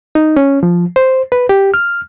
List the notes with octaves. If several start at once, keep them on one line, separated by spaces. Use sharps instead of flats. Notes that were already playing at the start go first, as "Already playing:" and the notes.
D#4
C#4
F3
C5
B4
G4
F6